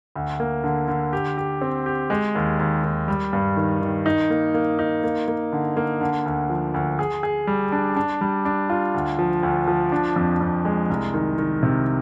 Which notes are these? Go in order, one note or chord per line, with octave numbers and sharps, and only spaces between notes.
D2
A#3
D3
D3
G4
G4
C4
G4
G#3
D#2
D#2
D#2
G3
G2
D#3
D#3
D#4
A#3
A#3
D#4
A#3
A#3
D3
A#3
D3
D2
F3
D2
G#4
G#4
G3
D4
D4
G3
D4
F4
D2
F3
D2
F3
D4
F2
F2
G#3
C2
D#3
D#3
C3